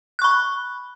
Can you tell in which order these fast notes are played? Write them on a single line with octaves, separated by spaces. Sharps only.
F#6 C#6 B5